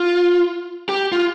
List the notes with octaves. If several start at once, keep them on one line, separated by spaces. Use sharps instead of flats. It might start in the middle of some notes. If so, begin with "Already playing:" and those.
Already playing: F4
G4
F4